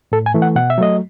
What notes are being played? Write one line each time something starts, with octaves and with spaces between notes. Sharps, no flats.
A2 A4
G#5
E3 A3
F#5
B2 F#5
E5
F#3 A3 D#5